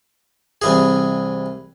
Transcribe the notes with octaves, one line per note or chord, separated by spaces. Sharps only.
C2 E3 G#4